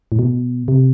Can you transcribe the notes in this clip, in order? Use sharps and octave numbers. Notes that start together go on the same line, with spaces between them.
A2
B2
C3